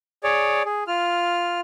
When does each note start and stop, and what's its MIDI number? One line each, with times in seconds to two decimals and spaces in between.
0.24 0.63 68
0.24 0.63 73
0.24 0.63 74
0.65 0.84 68
0.87 1.61 65
0.87 1.61 89